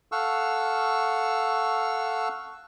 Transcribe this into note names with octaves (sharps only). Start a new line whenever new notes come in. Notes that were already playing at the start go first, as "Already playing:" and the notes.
A4 F5 F#5 C#6 E6